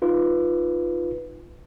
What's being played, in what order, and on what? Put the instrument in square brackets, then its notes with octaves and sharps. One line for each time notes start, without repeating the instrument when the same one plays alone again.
[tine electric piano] D#4 F4 B4